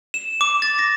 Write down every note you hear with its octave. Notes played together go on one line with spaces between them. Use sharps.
E7
D6
A6
A#6